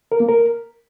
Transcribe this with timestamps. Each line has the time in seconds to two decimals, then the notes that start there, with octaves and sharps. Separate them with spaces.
0.12 A#4
0.20 A#3
0.29 A#4